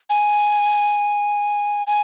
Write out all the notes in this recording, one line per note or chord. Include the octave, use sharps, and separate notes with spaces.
G#5
G#5